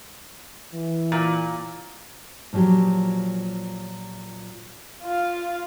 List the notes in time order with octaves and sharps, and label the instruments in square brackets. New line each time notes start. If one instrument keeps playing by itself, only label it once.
[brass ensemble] E3
[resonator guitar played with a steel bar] A#2
[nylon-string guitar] A#2 F3 F#3 G4
[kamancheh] F4 F5